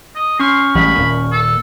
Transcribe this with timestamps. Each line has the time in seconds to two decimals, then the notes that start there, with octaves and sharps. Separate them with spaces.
0.16 D#5
0.40 C#4 C6 C#6 F6
0.75 A1 G3 G#3 B5
0.98 D#1 A#2 A#3
1.32 A4